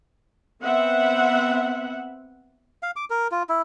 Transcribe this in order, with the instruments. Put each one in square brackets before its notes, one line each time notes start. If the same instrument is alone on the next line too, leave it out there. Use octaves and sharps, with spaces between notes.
[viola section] B3 C4 E5 F#5
[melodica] F5
D6
A#4
F4
E4